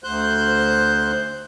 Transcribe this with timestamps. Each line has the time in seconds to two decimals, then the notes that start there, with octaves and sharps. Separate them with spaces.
0.04 D2 C5 F#6 G6